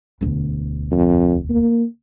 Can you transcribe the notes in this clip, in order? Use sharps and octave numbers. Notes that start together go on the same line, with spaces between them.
E1 D2
F2
A#3